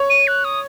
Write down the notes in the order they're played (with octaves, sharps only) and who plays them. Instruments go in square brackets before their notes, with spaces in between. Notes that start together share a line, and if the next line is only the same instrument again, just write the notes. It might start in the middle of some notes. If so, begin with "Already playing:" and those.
Already playing: [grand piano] C#5
[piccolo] D#7
F#6
D#6